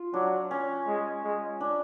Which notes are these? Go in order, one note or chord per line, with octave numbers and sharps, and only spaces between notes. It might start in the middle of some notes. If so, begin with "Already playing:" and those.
Already playing: F4
F#3 D4
C#4
G#3
G#3
D4